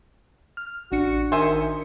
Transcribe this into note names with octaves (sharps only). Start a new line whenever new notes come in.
F6
A1 D4 F#4 C#7
D#3 C5 E5 G#5